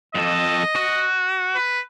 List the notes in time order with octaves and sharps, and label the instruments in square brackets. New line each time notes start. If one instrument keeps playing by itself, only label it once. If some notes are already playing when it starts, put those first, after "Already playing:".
[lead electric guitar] F2 A4 [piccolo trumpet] D#5
[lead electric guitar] F#4
[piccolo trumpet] B4